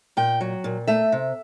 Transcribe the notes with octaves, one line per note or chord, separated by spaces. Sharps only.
A#2 G5
F#3
A#2
A3 E5
C3